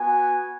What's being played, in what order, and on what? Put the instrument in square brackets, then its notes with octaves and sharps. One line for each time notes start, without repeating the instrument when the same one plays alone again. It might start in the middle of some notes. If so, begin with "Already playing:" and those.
Already playing: [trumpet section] B3 F#4 G#5